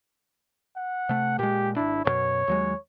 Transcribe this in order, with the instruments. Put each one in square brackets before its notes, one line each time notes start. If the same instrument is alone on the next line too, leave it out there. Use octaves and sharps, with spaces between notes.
[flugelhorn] F#5
[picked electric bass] C3 A3
[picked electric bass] A#2 G#3 [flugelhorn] G4
[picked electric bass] G#1 D4 [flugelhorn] E4
[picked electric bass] A1 F#2 B2 [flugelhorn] C#5
[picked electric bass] D#2 F#3 G#3